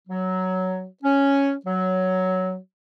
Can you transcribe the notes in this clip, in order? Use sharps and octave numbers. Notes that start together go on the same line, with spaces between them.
F#3
C#4
F#3